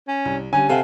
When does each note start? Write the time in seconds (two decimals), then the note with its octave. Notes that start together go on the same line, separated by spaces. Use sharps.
0.08 C#4
0.25 C2
0.53 D3 G3 C#4 G#5
0.69 C3 A4 F5 F#5